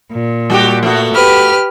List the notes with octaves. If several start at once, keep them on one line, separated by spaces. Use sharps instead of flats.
A#2
G3 F#4 G4
A3 B3 F#4
G4 B4 F6